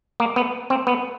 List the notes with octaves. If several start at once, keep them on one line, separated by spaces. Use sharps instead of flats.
A#3
B3
C4
B3